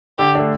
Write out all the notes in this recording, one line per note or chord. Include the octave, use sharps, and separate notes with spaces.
D3 G4
A3 D4